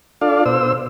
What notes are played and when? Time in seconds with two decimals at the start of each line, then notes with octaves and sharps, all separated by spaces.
0.21 D4 F4 A4 D5 F5
0.46 B2 C5 E6